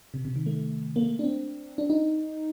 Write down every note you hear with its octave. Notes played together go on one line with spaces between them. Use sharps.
C3
C3
D#3
A3
A#3
A3
D4
C4
D4
D#4